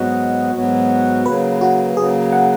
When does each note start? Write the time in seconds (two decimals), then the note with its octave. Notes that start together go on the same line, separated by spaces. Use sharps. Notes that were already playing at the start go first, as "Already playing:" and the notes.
Already playing: G#2 F#3 B3 F#4 D#5
0.54 G#2 F#3 B3 F#4
1.25 C#3 F#3 A#3 B4
1.61 F#4
1.97 C#3 F#3 A#3 G#4
2.33 F#5